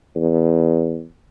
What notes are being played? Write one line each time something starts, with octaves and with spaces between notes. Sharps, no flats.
E2